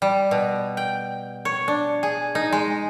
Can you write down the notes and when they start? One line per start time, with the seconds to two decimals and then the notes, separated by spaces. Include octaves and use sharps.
0.02 G3
0.31 B2
0.77 G5
1.45 C#5
1.68 D4
2.03 G#4
2.35 D#4
2.52 G#3